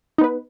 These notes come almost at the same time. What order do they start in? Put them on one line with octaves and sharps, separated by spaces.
D#4 B3 B4